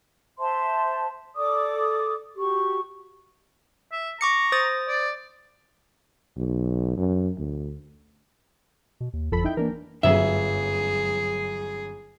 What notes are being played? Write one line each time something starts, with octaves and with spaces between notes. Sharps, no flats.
C5 E5 A5 C6
A4 D5 D6 D#6
F#4 G4 C#6
E5
A#5 C#6 D6 C#7
C5 D#6 A6
D5
B1
F#2
D2
B2
D#2
G1 F2 A4 B5
D#4 E4 G5
E3 A#3 D4 A#4
G1 F#2 F#4 G#4 E5